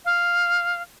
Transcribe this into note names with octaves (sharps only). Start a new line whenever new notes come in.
F5